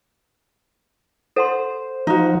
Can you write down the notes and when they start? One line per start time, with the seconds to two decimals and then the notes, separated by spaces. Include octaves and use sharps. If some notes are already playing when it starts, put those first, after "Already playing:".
1.36 A4 C5 F#5 C6
2.07 F3 D#4 F#4